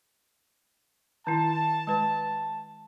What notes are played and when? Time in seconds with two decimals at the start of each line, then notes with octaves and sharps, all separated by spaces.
1.27 D#3 E4 A5
1.87 G#3 B4